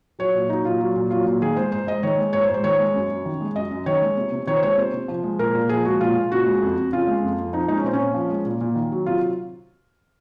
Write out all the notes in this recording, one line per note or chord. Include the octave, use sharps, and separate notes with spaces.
F#3 C#5
A#2
F#3 D#4
A#2 F4
F#3
A#2
F#3 F4
A#2
D#3 G#4
G#3 C5
G#2 C5
G#2 D#5
D#3 C#5
G#3
G#2 C#5
C5
G#2
C5
D#3 C#5
G#3
F#2
F#2
D#3
G#3
F#2 D#5
F#2
D#3 C#5
G#3
C3
C3
D#3 C#5
C5
G#3 C#5
C3 C5
C3
F3
G#3
A#2 A#4
A#2
F3 G#4
G#3 F#4
A#2 F4
A#2
C#3 F#4
G#3
F2
F2
C#3 F4
G#3
F2
F2
F3 D#4
G#3 D#4
C#4
A#2 C4
C#4
A#2
F3
G#3
A#2
A#2
D#3
F#3
C3 F4